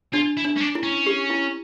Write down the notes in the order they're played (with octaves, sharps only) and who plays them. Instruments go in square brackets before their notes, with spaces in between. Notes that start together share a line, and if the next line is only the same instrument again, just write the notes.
[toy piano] D4 [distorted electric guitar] F4
[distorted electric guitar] E4
[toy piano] D4
[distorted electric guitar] C#4
D4
[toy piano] E4
[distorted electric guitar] C#4
[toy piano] G4
E4